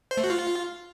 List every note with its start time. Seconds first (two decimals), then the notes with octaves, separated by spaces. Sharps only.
0.11 C5
0.17 A3
0.24 F#4
0.30 F4